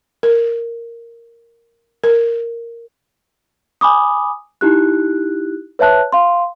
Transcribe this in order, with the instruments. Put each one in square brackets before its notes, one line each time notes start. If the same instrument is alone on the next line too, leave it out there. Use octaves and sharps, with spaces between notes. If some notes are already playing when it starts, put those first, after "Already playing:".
[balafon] A#4
A#4
[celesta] G#5 B5 D6 D#6
D#4 E4 G4 F#6
B4 C#5 E5 A5 F#6
F5 C6